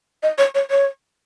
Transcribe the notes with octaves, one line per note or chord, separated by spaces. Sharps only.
D#5
C#5
C#5
C#5